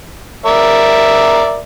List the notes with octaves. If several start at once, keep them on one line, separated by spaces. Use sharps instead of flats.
A#4 D5 E5